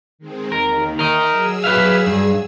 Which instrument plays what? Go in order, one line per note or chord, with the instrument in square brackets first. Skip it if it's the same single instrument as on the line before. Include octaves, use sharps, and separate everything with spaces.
[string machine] D#3 G#3 C4
[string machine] D#2 D#3 [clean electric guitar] A#4
[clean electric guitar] A#4 D#5 [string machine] E5
[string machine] F#3 G#4 E6
[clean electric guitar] B4 E5 F5
G2